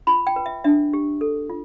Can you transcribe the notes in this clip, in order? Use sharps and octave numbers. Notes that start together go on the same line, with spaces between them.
F4 B5
G5
B4
E5
D4 E5
G4
A4
F4